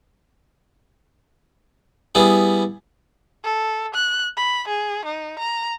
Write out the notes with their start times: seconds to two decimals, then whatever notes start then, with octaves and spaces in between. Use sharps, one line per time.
2.15 G3 B3 E4 G#4
3.44 A4
3.94 F#6
4.37 B5
4.68 G#4
5.05 D#4
5.39 A#5